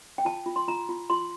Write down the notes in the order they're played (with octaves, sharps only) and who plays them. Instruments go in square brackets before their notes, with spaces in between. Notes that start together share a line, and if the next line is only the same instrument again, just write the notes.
[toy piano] G5
F4 A5
F4
C6
F4 A#5
F4
F4 C6